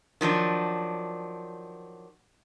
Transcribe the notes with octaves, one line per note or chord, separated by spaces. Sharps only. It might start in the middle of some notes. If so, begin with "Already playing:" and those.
D#3 F3 F#3 D4